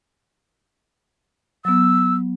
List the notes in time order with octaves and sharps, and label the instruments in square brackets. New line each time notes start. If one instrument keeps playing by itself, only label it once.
[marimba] F#3 B3 [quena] E6